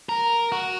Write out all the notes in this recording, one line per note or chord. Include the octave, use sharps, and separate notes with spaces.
A#4
F#4